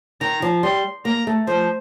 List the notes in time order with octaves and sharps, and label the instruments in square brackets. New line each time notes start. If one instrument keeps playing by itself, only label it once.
[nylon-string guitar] D#3 [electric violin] A#5
[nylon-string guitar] F3
[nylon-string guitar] G3 [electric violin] C6
[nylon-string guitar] A#3 [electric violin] A#5
[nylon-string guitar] A3
[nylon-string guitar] F3 [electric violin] C5